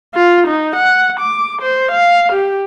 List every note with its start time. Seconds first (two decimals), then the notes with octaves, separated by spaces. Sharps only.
0.14 F4
0.47 D#4
0.76 F#5
1.20 D6
1.62 C5
1.92 F5
2.32 G4